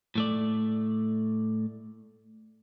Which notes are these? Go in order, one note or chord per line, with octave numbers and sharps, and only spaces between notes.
A2 A3 D5